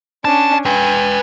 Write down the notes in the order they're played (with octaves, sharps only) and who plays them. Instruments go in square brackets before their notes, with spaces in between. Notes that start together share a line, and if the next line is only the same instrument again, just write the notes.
[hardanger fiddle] C#4 D4 [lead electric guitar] A5
[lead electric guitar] B4 G5 [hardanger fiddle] G#5